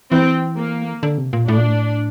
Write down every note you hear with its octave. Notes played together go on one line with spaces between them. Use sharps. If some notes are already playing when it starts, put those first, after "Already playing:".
E3 C4
A#3
D3
C3
A#2
A2 D4
A#2
A2